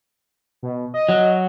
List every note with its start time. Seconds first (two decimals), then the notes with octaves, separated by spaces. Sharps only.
0.63 B2
0.94 D#5
1.09 F#3